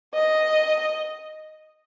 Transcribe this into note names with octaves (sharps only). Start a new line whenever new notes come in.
D#5